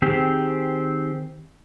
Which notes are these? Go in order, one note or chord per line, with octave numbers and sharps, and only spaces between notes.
D#3 C4 G4 G#4